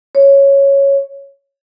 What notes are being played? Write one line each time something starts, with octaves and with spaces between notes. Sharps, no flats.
C#5